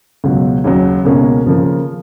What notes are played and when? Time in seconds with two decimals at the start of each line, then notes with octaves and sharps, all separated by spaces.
0.24 C#2 B2 F#3
0.64 D#2 C#3 F#3
1.05 C#2 B2 A#3 C#4
1.46 C#3 F3 A#3